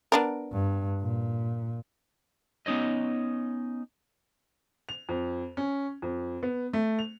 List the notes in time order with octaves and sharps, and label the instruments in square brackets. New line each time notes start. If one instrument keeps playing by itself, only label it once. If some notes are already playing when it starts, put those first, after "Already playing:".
[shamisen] B3 D4 A#4
[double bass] G2
A#2
[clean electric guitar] B3 C#4 D#4 C#5 D#5
[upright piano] F7
F2
C#4
F2
B3
A3
F7